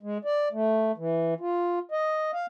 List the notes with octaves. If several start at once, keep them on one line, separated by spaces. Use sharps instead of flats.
G#3
D5
A3
E3
F4
D#5
F5